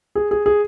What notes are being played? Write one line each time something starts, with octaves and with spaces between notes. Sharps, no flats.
G#4
G#4
G#4